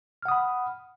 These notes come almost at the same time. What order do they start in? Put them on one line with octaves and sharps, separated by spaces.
F6 F#5 D#6 B5